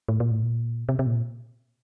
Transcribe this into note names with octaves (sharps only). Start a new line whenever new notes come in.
A2
A#2
A2
A#2
C3
C3
A#2